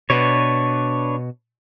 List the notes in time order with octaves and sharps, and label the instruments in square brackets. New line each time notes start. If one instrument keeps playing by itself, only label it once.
[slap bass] B2 [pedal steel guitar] D4 B4 C#5